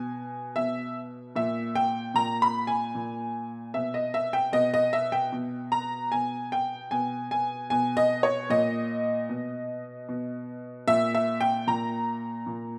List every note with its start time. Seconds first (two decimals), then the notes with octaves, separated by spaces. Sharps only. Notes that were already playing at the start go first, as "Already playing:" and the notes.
Already playing: B2 G#5
0.56 B2 E5
1.36 A#2 E5
1.75 G5
2.14 A#2 A#5
2.42 B5
2.67 G#5
2.95 A#2
3.74 B2 E5
3.94 D#5
4.14 E5
4.33 G5
4.53 B2 D#5
4.74 D#5
4.93 E5
5.12 G5
5.32 B2
5.72 A#5
6.12 B2 G#5
6.52 G5
6.91 B2 G#5
7.31 G#5
7.70 B2 G#5
7.97 D#5
8.23 C#5
8.50 A#2 D#5
9.29 B2
10.09 B2
10.88 A#2 E5
11.15 E5
11.41 G5
11.67 A#2 A#5
12.47 A#2